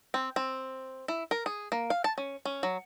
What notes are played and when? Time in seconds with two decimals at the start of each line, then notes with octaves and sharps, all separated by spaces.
0.14 C4
0.36 C4
1.08 E4
1.31 A#4
1.46 G#4
1.72 A#3
1.90 F5
2.04 A5
2.18 C#4
2.45 C#4
2.63 F#3